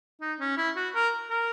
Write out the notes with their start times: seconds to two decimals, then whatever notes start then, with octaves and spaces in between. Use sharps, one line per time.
0.21 D#4
0.40 C#4
0.57 E4
0.76 F#4
0.95 A#4
1.30 A#4